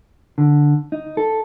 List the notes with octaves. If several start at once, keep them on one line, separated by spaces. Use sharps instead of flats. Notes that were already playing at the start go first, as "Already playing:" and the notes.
D3
D#4
A4